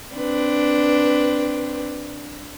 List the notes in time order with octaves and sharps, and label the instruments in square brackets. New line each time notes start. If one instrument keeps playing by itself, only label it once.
[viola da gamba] C4 D4 B4